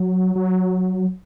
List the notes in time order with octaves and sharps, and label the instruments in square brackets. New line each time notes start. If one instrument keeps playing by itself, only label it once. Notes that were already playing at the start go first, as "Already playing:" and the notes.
Already playing: [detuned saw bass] F#3
F#3